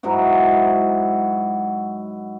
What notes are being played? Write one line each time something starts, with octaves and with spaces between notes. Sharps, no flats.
G#2 F#3 E4 F#4